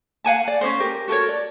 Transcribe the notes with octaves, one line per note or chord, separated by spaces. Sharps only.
F5 F#5 G#5 A5
D5
C#4 D4 A#4 C5
G4 A#4
F#4 A4 A#4 C#5
D5